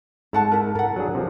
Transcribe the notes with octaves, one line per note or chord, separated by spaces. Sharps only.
G#2 A4 F#5 A5
E4 A#4
A4 A#4 F#5
F#3 D4 G#4
C3 F3